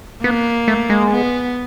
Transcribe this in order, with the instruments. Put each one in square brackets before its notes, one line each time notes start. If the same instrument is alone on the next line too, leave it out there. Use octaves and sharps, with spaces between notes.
[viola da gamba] A#3 [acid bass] B3
[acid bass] A3
G#3
[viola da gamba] B3